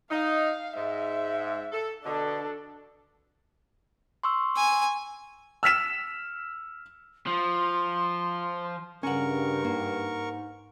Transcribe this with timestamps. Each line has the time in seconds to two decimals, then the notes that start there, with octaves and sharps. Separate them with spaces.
0.11 D#4 F5
0.76 G#2 E5
1.72 A4
2.05 B2 D3 D4 A4
4.23 C6 C#6 E6
4.57 G#5
5.63 E6 F6 B6 E7
7.27 F3 C6
9.03 G2 C#3 C#4 A#4 F#5 C#6
9.65 G#2 A#3